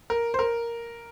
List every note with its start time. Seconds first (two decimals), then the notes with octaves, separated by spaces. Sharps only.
0.10 A#4
0.34 C5
0.39 A#4